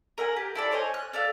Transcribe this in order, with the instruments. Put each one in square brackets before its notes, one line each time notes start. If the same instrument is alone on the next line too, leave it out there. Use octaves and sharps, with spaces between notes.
[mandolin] A#4 E5 F#5 G#5
G4
E4 A4 D5
C5 C#5 D#5 G#5
F#6
A4 D5 E5 F5